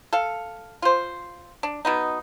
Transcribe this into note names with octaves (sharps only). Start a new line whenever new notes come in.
A4 F5
F4 C5
D4
B2 B3 D#4